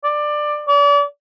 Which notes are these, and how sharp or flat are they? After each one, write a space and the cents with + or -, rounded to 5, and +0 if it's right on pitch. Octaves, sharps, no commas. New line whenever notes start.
D5 +15
D5 -40